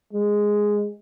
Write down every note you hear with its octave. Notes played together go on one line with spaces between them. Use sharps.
G#3